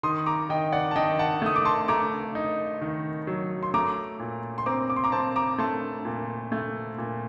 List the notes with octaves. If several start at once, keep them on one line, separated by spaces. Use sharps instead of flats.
D#3 C6 D#6
A#5 D6
D#3 D#5 G5
D5 F#5
A5
D#3 D#5 G5
F#5 A5
A3 D#6
D6
A5 C6
A3 A#5 D6
D#4
D#3
F#3
C6
A3 A#5 D6
A#2
C6
C4 A#5 D6
D6
C6
A#5 D6
C4 A5 C6
A#5 D6
A3 A5 C6
A#2
A3
A#2